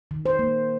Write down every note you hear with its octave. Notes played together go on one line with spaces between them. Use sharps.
D#3
C5
A#3